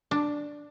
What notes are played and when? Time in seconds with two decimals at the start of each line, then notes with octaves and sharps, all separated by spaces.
0.11 D4